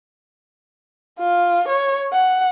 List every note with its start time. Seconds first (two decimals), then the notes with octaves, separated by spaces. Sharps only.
1.19 F4
1.68 C#5
2.13 F#5